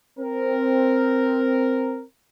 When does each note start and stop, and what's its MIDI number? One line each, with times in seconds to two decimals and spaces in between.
0.18 2.03 60
0.18 2.03 70